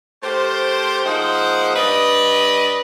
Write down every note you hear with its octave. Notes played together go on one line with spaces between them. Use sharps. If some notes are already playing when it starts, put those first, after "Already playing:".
A3 G4 A#4 C5
F3 G#3 A#3 D#4 C5 F#5
G2 B4 D5 D#5